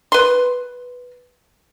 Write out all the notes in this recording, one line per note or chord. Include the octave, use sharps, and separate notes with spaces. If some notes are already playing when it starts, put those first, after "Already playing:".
B4 C6